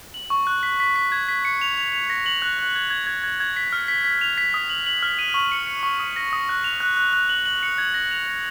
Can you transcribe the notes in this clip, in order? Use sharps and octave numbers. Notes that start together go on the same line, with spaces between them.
F#7
C#6
F#6
B6
B6
B6
G#6
B6
C#7
F7
F7
F7
A#6
F#7
F#6
F#6
G#6
G#6
G#6
G#6
G#6
B6
F6
B6
B6
F7
B6
D#6
F#7
F#7
F6
D#7
C#6
C#7
C#7
C#6
D#6
A#6
D#6
F#6
F7
F#6
F#6
F#6
F#7
F#7
C#7
G#6
A#6
F7
A#6